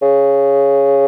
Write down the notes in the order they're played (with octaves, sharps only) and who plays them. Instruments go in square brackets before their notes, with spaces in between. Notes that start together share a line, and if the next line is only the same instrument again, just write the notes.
[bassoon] C#3